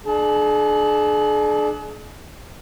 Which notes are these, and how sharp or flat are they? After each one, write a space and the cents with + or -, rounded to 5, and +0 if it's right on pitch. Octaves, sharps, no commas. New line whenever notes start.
D4 +25 G#4 +40 A5 +0